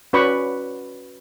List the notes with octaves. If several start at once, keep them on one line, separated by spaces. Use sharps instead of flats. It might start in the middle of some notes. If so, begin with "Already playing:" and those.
C#4 F#4 B4 D5 B5 C#6